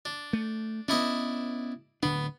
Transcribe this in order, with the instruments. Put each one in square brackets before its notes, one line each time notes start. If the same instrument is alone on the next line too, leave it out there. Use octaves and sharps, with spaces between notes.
[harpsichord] D4
[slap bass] A3
[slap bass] B3 C#4 [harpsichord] D4 E4 D#5
[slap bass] D1 D3 D4 [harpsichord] B3